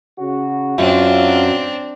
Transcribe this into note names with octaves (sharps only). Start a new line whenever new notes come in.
C#3 F#4
F#2 F#3 C4 D4 F4